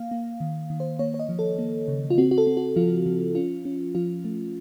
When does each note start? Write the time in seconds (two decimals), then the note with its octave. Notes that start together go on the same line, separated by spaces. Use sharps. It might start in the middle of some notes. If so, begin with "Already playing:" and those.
Already playing: A#3 F5
0.11 A#3
0.40 D#3
0.70 D#3
0.80 C5
0.99 A#3 C#5
1.14 C#5
1.19 D#5
1.29 F3
1.39 A4
1.59 A#3
1.88 C#3
2.10 F4
2.18 C4 F#4
2.31 F#4
2.38 A4
2.47 C4
2.57 F#4
2.76 F3 F4
3.06 F3
3.35 C#4 F4
3.65 C#4
3.95 F3 F4
4.25 A3